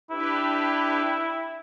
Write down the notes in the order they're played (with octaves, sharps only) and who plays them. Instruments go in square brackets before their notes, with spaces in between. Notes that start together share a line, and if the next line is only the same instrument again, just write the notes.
[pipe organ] D4 G4 B4 [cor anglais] E4